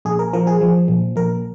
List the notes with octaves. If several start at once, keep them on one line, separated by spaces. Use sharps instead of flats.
A#1 G#4
A#4
F3 A#4
G#4
F3
A#1
A#1 A#4